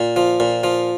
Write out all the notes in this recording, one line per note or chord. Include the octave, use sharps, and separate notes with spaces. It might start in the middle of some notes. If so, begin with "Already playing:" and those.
Already playing: A#2
F3
A#2
F3